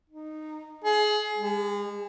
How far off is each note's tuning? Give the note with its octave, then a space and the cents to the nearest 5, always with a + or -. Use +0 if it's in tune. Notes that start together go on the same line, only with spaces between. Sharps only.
D#4 -10
G#4 +25
G#3 -35